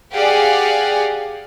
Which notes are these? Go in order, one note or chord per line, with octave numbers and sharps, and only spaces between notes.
G4 G#4 D5 F5 F#5 G#5